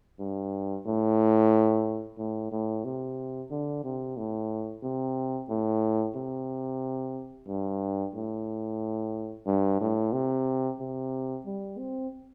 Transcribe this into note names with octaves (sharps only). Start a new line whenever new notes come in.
G2
A2
A2
A2
C3
D3
C3
A2
C3
A2
C3
G2
A2
G2
A2
C3
C3
G3
C4